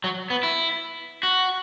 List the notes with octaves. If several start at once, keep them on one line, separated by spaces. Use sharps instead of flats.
F#3
B3
E4
F#4